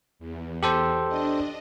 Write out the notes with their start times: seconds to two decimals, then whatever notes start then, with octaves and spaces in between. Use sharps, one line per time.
0.19 E2
0.63 G4 A4 C5
1.08 D4 D#5